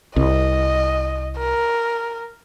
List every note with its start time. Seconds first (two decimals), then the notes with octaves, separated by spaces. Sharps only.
0.16 C2 D#5
1.37 A#4